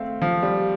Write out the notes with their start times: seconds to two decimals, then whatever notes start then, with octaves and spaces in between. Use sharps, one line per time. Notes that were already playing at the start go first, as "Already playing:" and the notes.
Already playing: A3 C4 F5
0.22 F3
0.43 G3